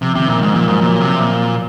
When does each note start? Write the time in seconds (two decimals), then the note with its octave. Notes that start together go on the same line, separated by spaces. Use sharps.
0.02 C3 F3
0.15 C3 D#3
0.29 A#2 C#3
0.41 G#2 D#3
0.54 A#2 F3
0.68 G#2 F#3
0.81 A#2 F3
1.01 C3
1.20 A#2